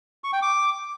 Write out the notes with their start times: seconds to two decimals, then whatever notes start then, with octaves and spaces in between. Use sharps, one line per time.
0.24 C#6
0.33 G5
0.42 D6